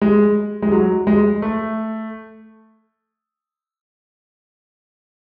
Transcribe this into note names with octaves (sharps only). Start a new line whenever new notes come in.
G#3
G#3
F#3
G#3
A3